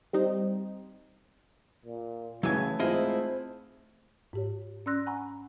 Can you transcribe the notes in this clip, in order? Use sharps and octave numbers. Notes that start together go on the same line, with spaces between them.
G3 C4 D#4
A#2
C#3 E3 F#3 A3 G#5 G#6
G#2 C4 E4 F4 G#4 D#5
G#2 G4 C#5
C#4 D5 C6 E6 F#6 A#6
F#5 G#5 A#5 B5 C#6